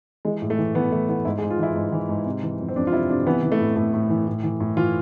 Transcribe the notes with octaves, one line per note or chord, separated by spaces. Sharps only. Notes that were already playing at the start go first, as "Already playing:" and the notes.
E3 G#3
A2
A3
E3
E3 B3
E3 A3
E3 B3
G#2 E4
G#4
G#2
F4
E3 E4
G#2
E3
G#2
C3
E3
F2
C4
F2 D4
F4
C3 E4
C3 D4
E3 B3
E3
A3
A2
A2 A3
A2
E3
A2
E3
A2
E3 F4